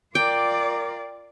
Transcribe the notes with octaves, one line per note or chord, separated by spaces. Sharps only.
F4 A#4 D5 G5 D6